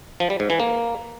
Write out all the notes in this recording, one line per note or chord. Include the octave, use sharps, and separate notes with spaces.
F3
G3
G#2
E3
A#3